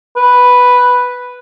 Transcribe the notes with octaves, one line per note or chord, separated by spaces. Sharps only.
B4